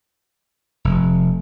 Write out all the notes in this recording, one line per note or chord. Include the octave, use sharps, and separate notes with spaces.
F1